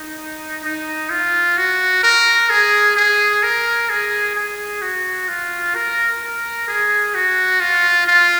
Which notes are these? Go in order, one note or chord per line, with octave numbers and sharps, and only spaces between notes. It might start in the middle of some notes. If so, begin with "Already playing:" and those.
Already playing: D#4
D#4
F4
F#4
A#4
G#4
G#4
A#4
G#4
G#4
F#4
F4
A#4
A#4
G#4
F#4
F4
F4